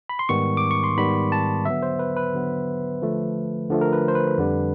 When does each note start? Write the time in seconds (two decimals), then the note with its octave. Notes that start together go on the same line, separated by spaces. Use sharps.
0.09 B5
0.19 C6
0.29 G#2 D#3 G3 B3 C#6
0.57 D6
0.71 C#6
0.84 C6
0.97 G#2 D#3 G3 B3 B5
1.32 A5
1.65 D3 F#3 B3 E5
1.82 C5
1.99 B4
2.16 B4
2.33 D3 F#3 B3
3.02 D3 F3 A3
3.70 D3 F3 A3
3.81 A#4
3.93 B4
4.08 C5
4.15 B4
4.38 F2 D3 G3